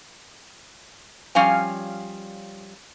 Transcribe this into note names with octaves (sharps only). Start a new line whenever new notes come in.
F3 G3 C#4 F5 G#5